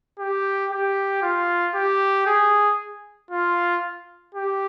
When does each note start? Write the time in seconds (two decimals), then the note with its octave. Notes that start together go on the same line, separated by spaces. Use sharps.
0.19 G4
0.71 G4
1.22 F4
1.75 G4
2.26 G#4
3.31 F4
4.35 G4